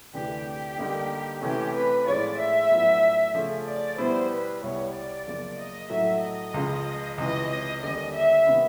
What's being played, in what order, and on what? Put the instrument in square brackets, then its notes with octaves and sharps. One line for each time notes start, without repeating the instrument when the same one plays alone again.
[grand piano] D2 C3 E3 A3 D4 [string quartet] G4
[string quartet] G4
[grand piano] D3 G3 A#3 D#4
[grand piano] C3 E3 A3 C#4 [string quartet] G4
[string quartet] B4
[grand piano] A2 F3 G#3 C#4 F4 [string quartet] D5
[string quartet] E5
[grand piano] A2 F#3 B3 D4 F4
C#3 F3 A3 C#4
[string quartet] D5
[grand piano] B2 G3 B3 E4 [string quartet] C5
[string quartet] B4
[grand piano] C2 B2 G3 [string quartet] C#5
[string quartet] D5
[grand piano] F#2 C#3 F3 A#3
[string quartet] D#5
[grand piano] A2 F#3 A3 [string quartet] E5
[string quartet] D#5
[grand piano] C#2 C#3 F3
[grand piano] C#2 C3 E3 [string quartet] D#5
[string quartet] D#5
[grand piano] D#2 D3 G3 A#3 C#4 [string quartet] D#5
[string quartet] E5
[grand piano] C3 D#3 G3 B3